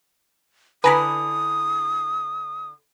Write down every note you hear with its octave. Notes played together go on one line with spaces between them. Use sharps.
D3 E4 B4 G#5 A#5 B5 D#6